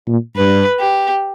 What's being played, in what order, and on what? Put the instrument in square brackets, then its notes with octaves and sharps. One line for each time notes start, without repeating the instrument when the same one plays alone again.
[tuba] A#2
[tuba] G2 [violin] B4
[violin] G4